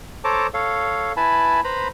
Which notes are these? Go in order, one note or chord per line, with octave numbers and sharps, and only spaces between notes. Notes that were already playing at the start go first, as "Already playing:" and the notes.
A4 C5 C#5 A5 A#5 D6
A4 C#5 F5
E4 B4 G#5 A5 B5
B4 C5 A#5 B5